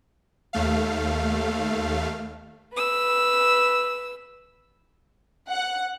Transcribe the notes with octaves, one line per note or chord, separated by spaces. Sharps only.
D#2 A3 F5
B4 E6
F#5